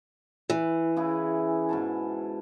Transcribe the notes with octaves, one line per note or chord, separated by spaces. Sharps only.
E3
C#3 E4 G#4
G#2 B2 A5